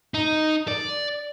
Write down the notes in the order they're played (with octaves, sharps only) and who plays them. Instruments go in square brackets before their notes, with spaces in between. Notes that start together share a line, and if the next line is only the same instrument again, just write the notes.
[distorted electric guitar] D#4
D5